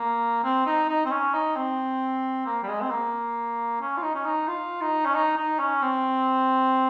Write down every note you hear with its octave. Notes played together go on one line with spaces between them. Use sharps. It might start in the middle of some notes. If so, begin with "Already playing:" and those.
Already playing: A#3
C4
D#4
D#4
C4
C#4
D#4
C4
A#3
G3
G#3
C4
A#3
C#4
F4
D#4
C#4
D#4
F4
D#4
C#4
D#4
D#4
C#4
C4